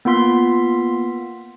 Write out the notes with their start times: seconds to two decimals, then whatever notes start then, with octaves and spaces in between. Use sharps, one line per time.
0.05 A#3 B3 F4 C6 B6